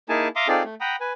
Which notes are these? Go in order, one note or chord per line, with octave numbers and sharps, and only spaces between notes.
A#3 D#4 E4 G#4 G#5 A5
E5 F5 A#5 C6 D6 D#6
C4 D#4 F4 G#4 A4 D5
A3
F#5 G5 A#5 B5 D#6
B4 G#5